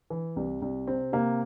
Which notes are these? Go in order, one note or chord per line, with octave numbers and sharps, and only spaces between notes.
E3
C2
C2
C3 C4
C3 A#3